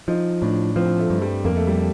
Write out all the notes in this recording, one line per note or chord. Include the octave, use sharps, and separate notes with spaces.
F3 D#4
A2 D4
F3 C4
A3
G2
G3
F2 A#3
A3
G3
A3